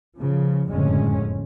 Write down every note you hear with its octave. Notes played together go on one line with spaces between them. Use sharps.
C#3 F3
F#1 F2 A2 D3 G#3 C#4